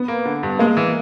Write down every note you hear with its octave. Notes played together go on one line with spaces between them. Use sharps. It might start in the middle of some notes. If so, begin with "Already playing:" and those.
Already playing: B3
A#3
D3
G2
G#3 A#3
E3